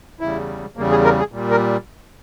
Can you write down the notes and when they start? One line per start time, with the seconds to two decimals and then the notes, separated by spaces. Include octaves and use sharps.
0.20 E2 C#3 G3 E4
0.77 E2 C#3 G3 A#3
0.90 G#4
1.05 A#4
1.19 G#4
1.32 A#2 G3
1.51 A#4